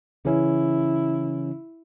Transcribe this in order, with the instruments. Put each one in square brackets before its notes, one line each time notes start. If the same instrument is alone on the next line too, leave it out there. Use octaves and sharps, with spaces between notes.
[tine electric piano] C#3 E3 C#4 [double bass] E4